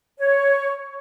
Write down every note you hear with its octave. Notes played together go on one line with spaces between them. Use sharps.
C#5